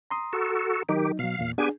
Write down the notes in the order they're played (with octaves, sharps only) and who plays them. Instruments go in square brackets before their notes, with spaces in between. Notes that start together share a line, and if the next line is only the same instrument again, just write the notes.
[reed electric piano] A#5 C6 D#6
[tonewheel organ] F#4 A4
[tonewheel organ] D#3 G4 [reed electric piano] F#3 D#4
[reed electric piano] B2 F#3 [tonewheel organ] F5
[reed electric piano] E2 A#2
[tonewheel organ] B3 G4 G#5 [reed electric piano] D4 G#4